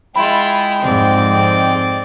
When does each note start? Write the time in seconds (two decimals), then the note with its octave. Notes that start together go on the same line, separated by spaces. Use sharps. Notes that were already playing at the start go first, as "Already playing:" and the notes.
0.16 G#3 E4 F4 G5 B5 C6
0.82 F2 G#2 C4 D5